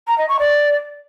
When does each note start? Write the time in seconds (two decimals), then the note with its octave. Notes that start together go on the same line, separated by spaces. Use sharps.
0.07 A#5
0.18 D#5
0.29 C#6
0.39 D5